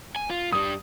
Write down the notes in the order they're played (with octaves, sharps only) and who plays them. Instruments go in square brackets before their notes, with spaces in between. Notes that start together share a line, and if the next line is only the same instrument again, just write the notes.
[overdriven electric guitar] G#5
F4
[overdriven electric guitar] G2 G3 [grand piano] D#6